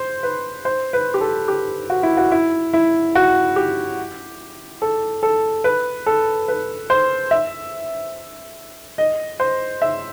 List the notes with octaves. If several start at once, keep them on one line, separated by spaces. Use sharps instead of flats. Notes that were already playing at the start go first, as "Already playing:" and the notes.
Already playing: C5
B4
C5
B4
G4
A4
G4
F#4
E4
F#4
E4
E4
F#4
G4
A4
A4
B4
A4
B4
C5
E5
D#5
C5
E5